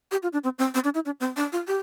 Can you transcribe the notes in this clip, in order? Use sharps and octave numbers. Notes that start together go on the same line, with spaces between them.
G4
F4
D4
C4
C4
C4
D4
E4
D4
C4
D4
F4
G4